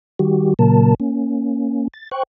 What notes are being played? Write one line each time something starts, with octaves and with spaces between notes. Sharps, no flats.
D#3 G3 F#4 G4
A#2 C#3 F#3 A#3 A#4 A5
A#3 C#4
A6
C5 G5 C#6 F#6